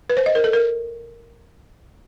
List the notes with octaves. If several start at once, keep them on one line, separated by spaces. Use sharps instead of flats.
B4
C5
D#5
A#4
A4
A#4